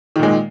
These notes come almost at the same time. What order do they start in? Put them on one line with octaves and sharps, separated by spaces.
D#3 A#2 G#3